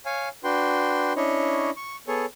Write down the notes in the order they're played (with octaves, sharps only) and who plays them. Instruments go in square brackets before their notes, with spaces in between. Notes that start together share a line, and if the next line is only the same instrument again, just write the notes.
[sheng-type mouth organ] C#5 F5 G#5
D4 F#4 B4 G5 C6
C#4 D4 E4 C#5 D#5
C#6
B3 G#4 A4 C#5